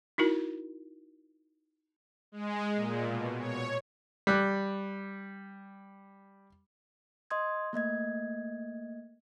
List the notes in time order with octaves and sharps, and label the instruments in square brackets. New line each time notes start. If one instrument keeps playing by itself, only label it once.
[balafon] D#4 E4 F#4 A#4
[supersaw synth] G#3
A#2
B2
C#5
[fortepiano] G3 D6 F#6
[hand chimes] D#5 C6 D#6 G#6
A3 A#3 D#5 G#6